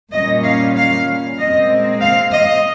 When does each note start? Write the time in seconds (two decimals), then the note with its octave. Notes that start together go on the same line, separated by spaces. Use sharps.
0.13 A#2 G3 C#4 D#5
0.44 F5
0.76 F5
1.38 A#2 G#3 C4 D#5
2.02 F5
2.33 D#5